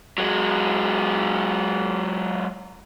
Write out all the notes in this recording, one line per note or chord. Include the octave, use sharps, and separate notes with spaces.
F#3 G#3